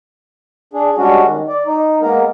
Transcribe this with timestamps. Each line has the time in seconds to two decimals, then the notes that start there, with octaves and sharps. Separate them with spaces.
0.74 D4 G#4
0.98 G3 G#3 C#4 D4 F#4
1.23 D#3
1.48 D5
1.66 D#4
2.02 G#3 A#3 B3 A#4